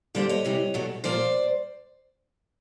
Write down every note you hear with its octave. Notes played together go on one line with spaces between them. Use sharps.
F2 D3 G3 A#3 C5 D5
C#5 D#5
F2 C3 E3 G3
E2 B2 F#3 A3
A#2 F3 A#3 C5 D5